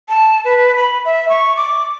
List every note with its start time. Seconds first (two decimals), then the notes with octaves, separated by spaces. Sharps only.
0.09 A5
0.45 B4
0.76 B5
1.05 E5
1.29 C#6
1.57 D6